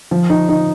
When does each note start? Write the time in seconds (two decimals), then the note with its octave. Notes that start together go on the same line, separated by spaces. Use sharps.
0.11 F3
0.30 D#4
0.49 D#4